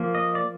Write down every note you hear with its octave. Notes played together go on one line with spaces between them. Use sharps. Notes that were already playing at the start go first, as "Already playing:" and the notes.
Already playing: F3 A#3
D#5
D5